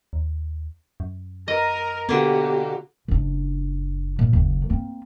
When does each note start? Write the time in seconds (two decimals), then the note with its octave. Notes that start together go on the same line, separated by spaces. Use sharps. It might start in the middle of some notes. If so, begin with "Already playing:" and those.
0.13 D#2
1.00 F#2
1.48 A#4 D#5
2.09 B2 D3 A#3 B3 F#4 G4
3.08 F#1 D4
4.19 A#2
4.33 F#1 D#2
4.70 A#3 C4